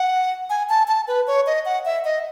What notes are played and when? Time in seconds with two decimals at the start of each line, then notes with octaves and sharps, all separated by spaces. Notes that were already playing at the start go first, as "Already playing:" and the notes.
Already playing: F#5
0.50 G#5
0.69 A5
0.88 A5
1.08 B4
1.27 C#5
1.47 D#5
1.66 F#5
1.85 E5
2.05 D#5